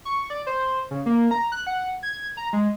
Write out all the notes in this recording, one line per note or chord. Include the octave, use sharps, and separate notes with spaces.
C#6
D5
C5
C#3
A#3
A#5
F#6
F#5
G#6
A#5
G#3